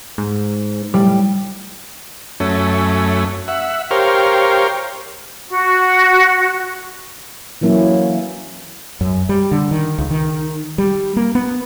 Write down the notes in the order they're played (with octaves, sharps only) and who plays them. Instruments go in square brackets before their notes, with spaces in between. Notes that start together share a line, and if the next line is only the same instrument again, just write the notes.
[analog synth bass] G#2
[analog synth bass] A2 [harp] G3
[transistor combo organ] F#2 A3 C#4
E5 F#5
G4 A#4 C5 C#5 F5
[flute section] F#4
[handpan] E3 F#3 A#3 C#4 E4
[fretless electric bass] F#2
G3
D3
D#3
C#2
D#3
G3
A#3
B3